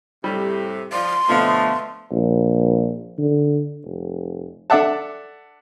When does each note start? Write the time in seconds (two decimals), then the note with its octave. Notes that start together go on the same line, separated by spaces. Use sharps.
0.24 A2 C3 G3
0.92 F3 D5 C6
1.29 B2 D3 F3 A3 B3 A4
2.11 A#1
3.18 D3
3.85 F1
4.70 D4 A4 D5 E5 F#5 A5